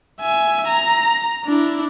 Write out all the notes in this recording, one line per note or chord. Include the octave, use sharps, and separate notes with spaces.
E5 G#5
A#5
D4 E4